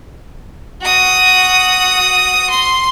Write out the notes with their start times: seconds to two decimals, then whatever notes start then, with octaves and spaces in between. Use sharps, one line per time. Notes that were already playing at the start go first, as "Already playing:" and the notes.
0.81 F#4 D#6
2.50 C6